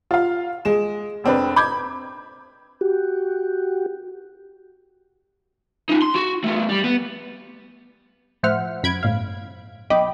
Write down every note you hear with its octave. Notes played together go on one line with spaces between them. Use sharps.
F4 F5
G#3 E7
F1 C4 D4 B4
B5 D6 G6 G#6
F#4 G4
C#4 D#4
C6
F#4
A3 B3
G3
B3
A2 F3 C5 E5 F#5 F6
F#2 B5 G#6 D7
G1 A2 F5
B1 D#5 G5 B5 D6